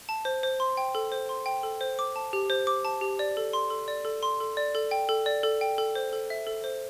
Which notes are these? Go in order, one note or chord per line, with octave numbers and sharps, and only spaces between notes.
A5
C5
C5
C6
G5
A4
C5
C6
G5
A4
C5
D6
A5
G4
C5
D6
A5
G4
D5
A4
C6
A4
D5
A4
C6
A4
D5
A4
G5
A4
D5
A4
G5
A4
C5
A4
E5
A4
C5